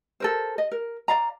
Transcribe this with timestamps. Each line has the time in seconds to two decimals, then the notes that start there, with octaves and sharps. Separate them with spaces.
0.20 A4 A#4 C5
0.58 D#5
0.72 A#4
1.08 D5 F5 A#5